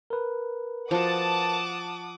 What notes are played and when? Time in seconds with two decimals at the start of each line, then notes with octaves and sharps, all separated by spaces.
0.10 A#4 B4
0.91 F3 F#4 F#5 A5 D6 D#6